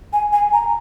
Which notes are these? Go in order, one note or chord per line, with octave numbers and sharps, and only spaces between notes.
G#5
G#5
A#5